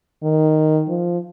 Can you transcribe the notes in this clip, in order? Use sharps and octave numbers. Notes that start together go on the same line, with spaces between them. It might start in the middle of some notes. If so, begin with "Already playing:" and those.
D#3
F3